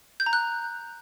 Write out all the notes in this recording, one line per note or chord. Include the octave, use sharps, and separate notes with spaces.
G6
A#5
F#6